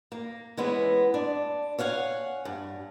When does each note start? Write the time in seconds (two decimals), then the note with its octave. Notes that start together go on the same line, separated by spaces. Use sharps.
0.12 A#3
0.57 E3 G#3 B3 C#4
1.14 D4
1.79 C#5 F5 F#5 G#5
2.45 G2